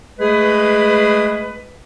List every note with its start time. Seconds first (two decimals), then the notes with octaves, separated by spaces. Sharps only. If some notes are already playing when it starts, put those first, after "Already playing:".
0.19 G#3 A3 G#4 B4